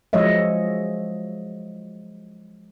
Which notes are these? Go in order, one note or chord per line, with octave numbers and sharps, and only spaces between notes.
F3 F#3 G#3 C#5 D#5 E5